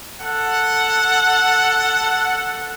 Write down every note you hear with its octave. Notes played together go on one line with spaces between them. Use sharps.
A4 F#5